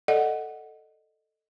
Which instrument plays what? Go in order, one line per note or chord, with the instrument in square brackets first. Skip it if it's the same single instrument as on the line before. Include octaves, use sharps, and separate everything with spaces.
[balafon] A4 D5 D#5 F#5